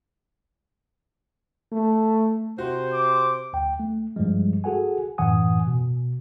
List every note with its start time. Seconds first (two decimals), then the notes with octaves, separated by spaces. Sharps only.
1.72 A3
2.58 C3 F#4 C5
2.93 D6
3.53 D2 G5
3.80 A3
4.16 G2 F3 G3 G#3
4.64 F#4 G#4 A4 F#5 G#5
5.18 F#2 A2 E3 F#5 G#5 D#6
5.67 B2